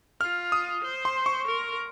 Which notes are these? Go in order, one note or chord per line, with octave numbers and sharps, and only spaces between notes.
F4 F6
D#6
C5
C6
C#6
A#4